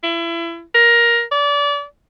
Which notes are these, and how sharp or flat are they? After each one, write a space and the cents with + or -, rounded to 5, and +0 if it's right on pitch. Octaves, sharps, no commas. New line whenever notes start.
E4 +30
A#4 +15
D5 -30